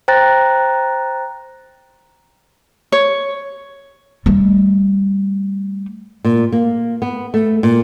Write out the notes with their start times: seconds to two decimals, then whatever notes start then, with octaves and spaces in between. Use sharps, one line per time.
0.08 C5 G5 A#5 F#6 A6 A#6
2.92 C#5
4.26 G3 A3
6.25 A#2
6.52 A#3
7.02 B3
7.34 A3
7.63 A#2